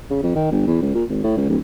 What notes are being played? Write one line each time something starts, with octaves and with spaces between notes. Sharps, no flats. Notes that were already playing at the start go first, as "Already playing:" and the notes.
C#3
F2
D#3
G1
E2
C#2
A#2
G#1
A2
C#2
D1